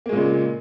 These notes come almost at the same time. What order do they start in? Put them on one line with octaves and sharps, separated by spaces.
A#3 G#3 A#2 C#3